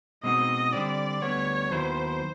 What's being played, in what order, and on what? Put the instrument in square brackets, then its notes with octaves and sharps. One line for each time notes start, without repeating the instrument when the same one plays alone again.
[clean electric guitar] B2 G#3 C4 D#4 F#4 [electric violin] D#5
[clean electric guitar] D3 G3 C4 [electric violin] D5
[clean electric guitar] D2 D3 G3 B3 [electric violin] C#5
[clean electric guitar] D#2 D#3 F#3 B3 E4 [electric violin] C5